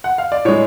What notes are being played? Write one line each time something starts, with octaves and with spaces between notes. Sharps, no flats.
F#5
F5
D5
A2 G#3 C#5